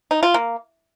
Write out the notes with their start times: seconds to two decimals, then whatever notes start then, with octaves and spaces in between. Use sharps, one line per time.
0.11 D#4
0.23 F4
0.34 A#3